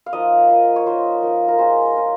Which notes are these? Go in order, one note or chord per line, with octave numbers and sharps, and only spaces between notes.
F5
F3 A#3 D#4 D#5
F3 A#3 D#4
C#5
F3 A#3 D#4 C5
F3 A#3 D#4
A#4
G#3 C#4 F4 C5
G#3 C#4 F4